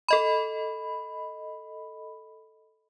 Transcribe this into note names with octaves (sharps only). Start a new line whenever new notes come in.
A4 D#5 B5